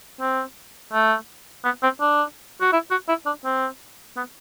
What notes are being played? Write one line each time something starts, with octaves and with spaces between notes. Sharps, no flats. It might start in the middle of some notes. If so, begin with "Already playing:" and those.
C4
A3
B3
C4
D4
F#4
E4
F#4
E4
D4
C4
B3